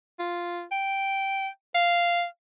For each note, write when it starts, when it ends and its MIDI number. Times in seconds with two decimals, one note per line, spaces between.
0.19 0.64 65
0.71 1.48 79
1.75 2.25 77